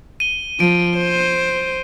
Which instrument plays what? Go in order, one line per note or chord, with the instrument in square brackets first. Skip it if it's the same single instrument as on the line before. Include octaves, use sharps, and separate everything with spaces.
[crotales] D#7 G7
[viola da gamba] F3 [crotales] D7
[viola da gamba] C5